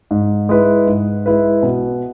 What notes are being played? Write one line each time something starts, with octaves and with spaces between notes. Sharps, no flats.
G#2
G#3 E4 B4
G#2
G#3 E4 B4
B2